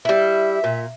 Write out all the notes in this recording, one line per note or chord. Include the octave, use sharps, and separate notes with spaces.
G3 E4 E5
A#2